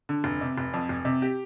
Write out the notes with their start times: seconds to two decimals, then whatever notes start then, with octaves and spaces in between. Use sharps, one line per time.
0.09 D3
0.24 F1
0.41 C3
0.58 F1
0.74 F2
0.89 F1
1.05 C3
1.22 G4